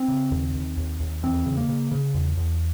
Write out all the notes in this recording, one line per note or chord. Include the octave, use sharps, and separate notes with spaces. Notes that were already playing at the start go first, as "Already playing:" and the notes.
Already playing: C4
C#3
D#2
D#2
D#2
D#2
E2 C4
C#3
A#3
C#3
C#3
E2
E2